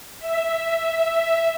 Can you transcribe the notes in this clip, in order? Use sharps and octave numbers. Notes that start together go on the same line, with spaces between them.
E5